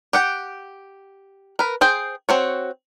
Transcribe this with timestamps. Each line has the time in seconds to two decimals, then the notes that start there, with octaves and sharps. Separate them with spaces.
0.13 G4 F#5 G5
1.59 A#4 B4
1.81 G#4 C5 G5
2.29 C4 F#4 C#5